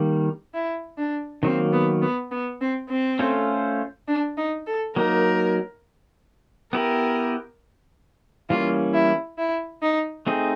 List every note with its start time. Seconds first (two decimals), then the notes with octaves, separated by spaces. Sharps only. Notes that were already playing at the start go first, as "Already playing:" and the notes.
Already playing: D#3 G3 A#3
0.54 E4
0.98 D4
1.43 D#3 F#3 A#3 C4
1.73 B3
2.02 B3
2.31 B3
2.61 C4
2.90 C4
3.19 A3 C#4 F4 A4 C5
4.08 D4
4.38 D#4
4.67 A4
4.96 F#3 A#3 D#4 A#4
6.73 B3 E4 G4 A#4 B4
8.50 E3 G3 A#3 C#4 F4
8.94 E4
9.38 E4
9.82 D#4
10.27 A3 C4 D#4 G#4